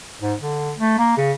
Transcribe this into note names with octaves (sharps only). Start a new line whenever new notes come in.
G#2
D3
A3
A#3
C#3